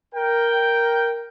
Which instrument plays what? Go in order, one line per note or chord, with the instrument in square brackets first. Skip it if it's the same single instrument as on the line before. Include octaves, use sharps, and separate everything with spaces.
[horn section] A#4 G5